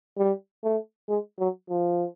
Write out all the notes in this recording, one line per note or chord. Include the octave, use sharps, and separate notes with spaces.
G3
A3
G#3
F#3
F3